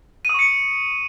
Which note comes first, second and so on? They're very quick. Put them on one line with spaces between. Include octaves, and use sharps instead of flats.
D#7 D#6 C#6 C#7